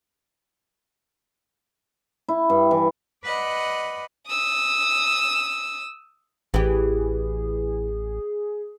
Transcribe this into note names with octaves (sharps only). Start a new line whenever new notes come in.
E4
G2
E3
B4 D5 D#5 F#5
D#6 E6
A1 E3 G4 G#4